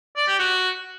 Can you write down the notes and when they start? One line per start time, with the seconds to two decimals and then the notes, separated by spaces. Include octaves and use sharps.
0.16 D5
0.28 G4
0.39 F#4